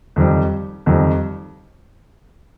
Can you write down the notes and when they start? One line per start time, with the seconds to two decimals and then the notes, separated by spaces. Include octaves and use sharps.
0.16 F2 D#3 G3
0.86 F2 D#3 G3